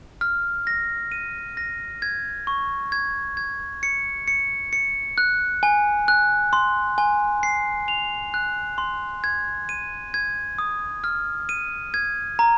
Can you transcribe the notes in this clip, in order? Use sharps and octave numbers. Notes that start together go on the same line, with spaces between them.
F6
A#6
D#7
A#6
G#6
C#6
G#6
G#6
C#7
C#7
C#7
F#6
G#5
F#6
C6
G#5
C7
F7
F#6
C6
G#6
D#7
G#6
D#6
F6
D#7
G#6
A#5